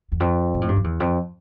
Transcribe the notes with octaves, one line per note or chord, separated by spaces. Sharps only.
E2
F2
A#2
A2
G2
F2
E2
F2